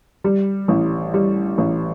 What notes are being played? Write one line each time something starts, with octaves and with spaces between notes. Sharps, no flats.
G3
A1
G3
A1